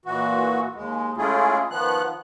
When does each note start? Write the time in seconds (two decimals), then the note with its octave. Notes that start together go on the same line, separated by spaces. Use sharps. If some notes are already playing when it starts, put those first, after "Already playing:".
0.05 A#2 E3 F#4
0.75 D#2 G#3
1.17 G#3 A3 C#4 E4 F4 G#4
1.71 D#3 F3 B3 F#6